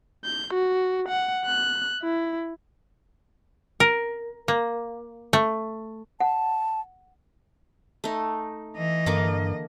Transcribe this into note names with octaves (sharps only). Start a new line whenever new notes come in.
G6
F#4
F#5
F#6
E4
A#4
A#3
A3
F#5 A5
A3 D#4
E3 D#5
G2 D3 A#3 D6